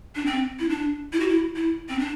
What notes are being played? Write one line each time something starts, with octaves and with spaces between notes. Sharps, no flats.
D4
C4
E4
D4
E4
F#4
E4
E4
C4
D4